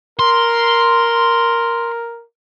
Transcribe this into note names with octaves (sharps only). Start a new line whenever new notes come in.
A#4 C6